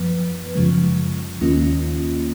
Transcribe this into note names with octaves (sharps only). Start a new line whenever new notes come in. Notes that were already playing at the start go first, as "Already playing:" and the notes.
Already playing: F#2 F3 B3 B4
F#2 C#3 F3 G#3
D#2 D#3 A#3 C#4 F4